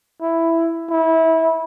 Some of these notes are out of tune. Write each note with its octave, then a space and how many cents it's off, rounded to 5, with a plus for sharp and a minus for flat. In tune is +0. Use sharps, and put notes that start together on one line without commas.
E4 +5
E4 -25